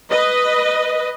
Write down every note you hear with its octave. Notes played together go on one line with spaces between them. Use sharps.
B4 D#5